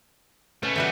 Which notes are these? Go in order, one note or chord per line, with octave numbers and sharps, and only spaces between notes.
B2 A3 B3 C#4
E3 G3 F#4